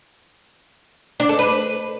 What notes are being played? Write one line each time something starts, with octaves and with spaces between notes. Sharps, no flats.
D4
A4
B4